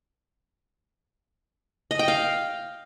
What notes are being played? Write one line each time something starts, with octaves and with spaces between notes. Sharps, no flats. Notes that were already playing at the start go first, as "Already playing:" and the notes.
D#5
G5
F5